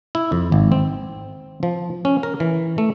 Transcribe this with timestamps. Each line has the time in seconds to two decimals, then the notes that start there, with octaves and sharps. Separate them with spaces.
0.15 E4
0.32 F2
0.52 G#1
0.72 C4
1.63 F3
2.05 C#4
2.23 A#4
2.40 E3
2.78 A3